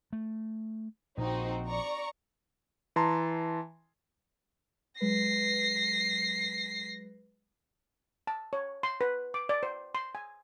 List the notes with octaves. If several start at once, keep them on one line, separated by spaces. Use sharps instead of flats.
A3
A#1 A#2 C4 D#4 F#4
D5 A#5 C#6
E3 A5 A#5 C6
F#3 G#3 B4 A#6 C7
A5
C#5
C6
B4
D6
D5
C5
C6
G#5